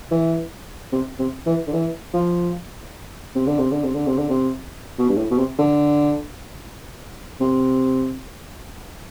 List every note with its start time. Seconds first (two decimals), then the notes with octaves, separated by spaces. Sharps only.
0.11 E3
0.93 C3
1.19 C3
1.46 E3
1.67 D3
1.73 E3
2.14 F3
3.35 C3
3.47 D3
3.59 C3
3.71 D3
3.83 C3
3.94 D3
4.07 C3
4.18 D3
4.29 C3
4.98 B2
5.09 G2
5.17 A2
5.31 B2
5.38 C3
5.59 D3
7.41 C3